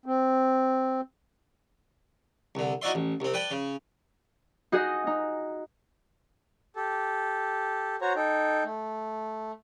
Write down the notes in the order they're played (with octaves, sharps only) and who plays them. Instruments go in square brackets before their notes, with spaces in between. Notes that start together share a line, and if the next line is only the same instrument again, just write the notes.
[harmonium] C4
[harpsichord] C2 D3
D#4 E4 F#4 D5 E5 C6
A1
C2 C4
B4 D5 G5 A5
C#3
[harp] D#4 F#4 G#4 D#5
D#4
[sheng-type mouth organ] G4 A4
F#4 C5 C#5 A#5
D#4 A4 G5
A3